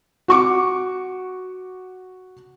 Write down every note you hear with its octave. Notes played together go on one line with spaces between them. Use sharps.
F#4 C#6 D6